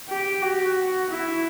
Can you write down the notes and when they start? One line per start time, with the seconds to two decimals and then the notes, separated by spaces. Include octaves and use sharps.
0.10 G4
0.43 F#4
1.10 E4